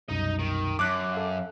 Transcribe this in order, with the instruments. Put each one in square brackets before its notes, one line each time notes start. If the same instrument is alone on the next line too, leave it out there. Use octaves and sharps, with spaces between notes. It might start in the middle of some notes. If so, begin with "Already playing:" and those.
[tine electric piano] C2 F#2 B2 [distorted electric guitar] D#4 D#5
[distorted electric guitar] D#3
[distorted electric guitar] F#2 [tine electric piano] A5 [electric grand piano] D6 F#6
[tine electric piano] A4 F5